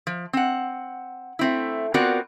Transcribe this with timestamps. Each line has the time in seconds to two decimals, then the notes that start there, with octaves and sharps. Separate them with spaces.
0.07 F3
0.33 C4 F#5
1.39 A3 C4 E4
1.94 B3 C4 F4 F#4 A#4 D5